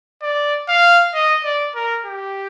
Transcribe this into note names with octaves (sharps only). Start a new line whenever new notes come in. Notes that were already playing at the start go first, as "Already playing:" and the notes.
D5
F5
D#5
D5
A#4
G4